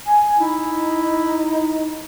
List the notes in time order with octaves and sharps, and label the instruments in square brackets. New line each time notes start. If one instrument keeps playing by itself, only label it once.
[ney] G#5
[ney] D#4 [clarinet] E4